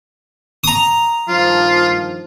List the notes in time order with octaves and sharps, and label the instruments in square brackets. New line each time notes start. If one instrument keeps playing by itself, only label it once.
[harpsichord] A#5 D#6
[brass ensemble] G2 D#3 F3 [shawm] F4